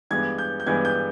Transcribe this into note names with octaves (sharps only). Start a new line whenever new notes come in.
G2 E3 G#3 B3 G#6
G6
G6
G2 E3 G#3 B3 G#6
G6